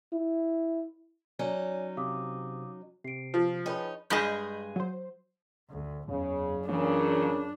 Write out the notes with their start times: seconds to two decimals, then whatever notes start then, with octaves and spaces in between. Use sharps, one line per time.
0.13 E4
1.39 F#3 C#4 D#4 C#5 D5 G#5
1.97 C3 F5 D6 D#6
3.05 C3 C7 D7
3.34 F3
3.66 D#4 G#4 B4 C#5 G5 B5
4.10 G2 G#3 G#4 D#5 B5 G6
4.76 F#3 C5
5.69 D2
6.08 F#1 E2 C#3
6.69 A#2 C#3 E3 D4